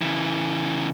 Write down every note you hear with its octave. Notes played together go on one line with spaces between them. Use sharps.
C#3 E3